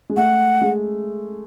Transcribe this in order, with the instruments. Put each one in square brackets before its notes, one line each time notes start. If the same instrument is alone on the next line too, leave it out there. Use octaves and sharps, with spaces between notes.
[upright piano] G#3
[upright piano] A3 [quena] F#5
[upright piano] G#3